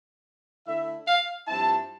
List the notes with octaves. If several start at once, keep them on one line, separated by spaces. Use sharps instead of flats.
D3 A3 E4 E5
F5
G2 F3 C4 E4 A5